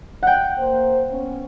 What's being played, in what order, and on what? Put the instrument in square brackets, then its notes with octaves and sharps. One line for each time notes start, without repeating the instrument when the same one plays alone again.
[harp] F#5 G5
[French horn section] A#3 C5
B3 C#4